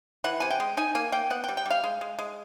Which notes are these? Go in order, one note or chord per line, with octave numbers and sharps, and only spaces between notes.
E3 F#5
C3 G#5
G5
G#3
D#4 G#5
A#3 G#5
A#3 G5
B3 F#5
G5
G3
G5
G3 F5
G#3
G#3
G#3